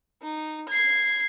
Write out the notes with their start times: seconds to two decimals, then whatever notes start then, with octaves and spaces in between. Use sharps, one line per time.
0.22 D#4
0.69 G#6 C7